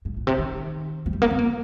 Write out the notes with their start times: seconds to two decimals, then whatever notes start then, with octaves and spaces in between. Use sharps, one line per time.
0.05 G#2
0.17 A#2
0.27 C3
0.38 D#3
1.06 F3
1.13 G3
1.22 A#3
1.31 C4
1.39 A#3